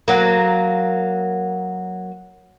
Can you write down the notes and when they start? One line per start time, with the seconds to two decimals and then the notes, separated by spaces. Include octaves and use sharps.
0.08 F#3 A#3